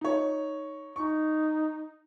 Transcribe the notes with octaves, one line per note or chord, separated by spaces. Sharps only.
D#4 C#5
D#4 C#6